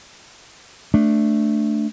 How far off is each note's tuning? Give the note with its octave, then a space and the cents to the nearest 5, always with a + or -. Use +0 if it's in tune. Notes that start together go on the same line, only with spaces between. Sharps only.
A3 +0 D4 +0